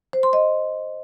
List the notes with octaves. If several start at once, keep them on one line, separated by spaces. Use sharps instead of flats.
C5
C6
D#5